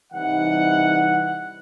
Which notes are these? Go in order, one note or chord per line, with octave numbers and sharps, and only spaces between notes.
C2 E3 D#4 F#5